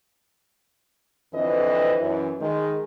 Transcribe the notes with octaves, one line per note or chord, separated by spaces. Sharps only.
F2 D3 E3 C4 B4 D#5
F#2 E3
D#3 G#3